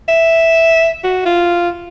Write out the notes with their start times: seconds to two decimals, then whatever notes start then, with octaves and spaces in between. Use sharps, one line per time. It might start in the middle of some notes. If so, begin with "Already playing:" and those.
0.09 E5
1.04 F#4
1.26 F4